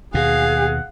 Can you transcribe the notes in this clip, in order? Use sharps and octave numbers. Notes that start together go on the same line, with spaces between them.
D#2 B2 G#4 F5 F#5